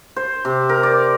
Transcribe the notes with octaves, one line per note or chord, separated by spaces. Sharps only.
C5
C3
A#4
D5